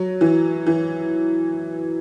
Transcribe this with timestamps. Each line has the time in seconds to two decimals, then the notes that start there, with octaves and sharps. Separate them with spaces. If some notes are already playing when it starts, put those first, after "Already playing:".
Already playing: F#3
0.21 E3
0.66 E3